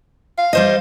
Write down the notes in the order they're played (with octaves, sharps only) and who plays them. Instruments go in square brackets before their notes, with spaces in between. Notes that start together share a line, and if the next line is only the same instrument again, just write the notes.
[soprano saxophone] F5
[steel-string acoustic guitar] G3 C5 D#5